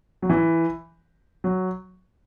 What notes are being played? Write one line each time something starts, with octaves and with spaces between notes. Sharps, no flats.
F#3
E3
F#3